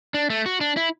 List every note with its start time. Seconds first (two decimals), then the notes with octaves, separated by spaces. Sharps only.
0.14 D4
0.30 A3
0.46 F#4
0.61 D4
0.77 E4